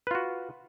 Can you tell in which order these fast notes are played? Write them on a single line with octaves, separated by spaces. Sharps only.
B4 F4 F#4